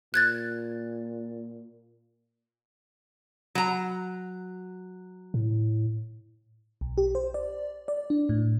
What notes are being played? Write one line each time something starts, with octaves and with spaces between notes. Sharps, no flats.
A#2 F#6 G#6 A6
F#3 A#5
A2
B1
G4
C5
D5
D5
D4
A2